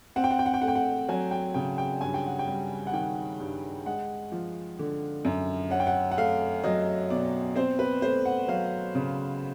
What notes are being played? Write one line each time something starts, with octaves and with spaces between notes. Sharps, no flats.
C4 F#5
G5
F#5
G5
F#5
G5
A3 F#5
G5
F#5
F#3 G#5
G5
C#3 G5
G5
G2 G#5
G5
F#5
G5
G3
F#5
D#3 G5
G2
G#3 F#5
F3
D3
F#2
C#4 F#5
G5
F#5
F#5
A3 F5
F#3 D#5
B2 D5
C4 C5
B4
A3 C5
F#5
F#3 F5
C#3